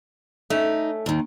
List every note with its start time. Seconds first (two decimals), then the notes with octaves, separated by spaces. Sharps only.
0.50 A3 C#4 D#4
1.06 D#2 D#3